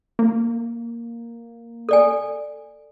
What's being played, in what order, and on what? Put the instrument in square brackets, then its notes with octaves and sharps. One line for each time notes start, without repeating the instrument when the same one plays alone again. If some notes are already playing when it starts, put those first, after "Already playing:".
[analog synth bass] A#3
[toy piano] A4 D5 G#5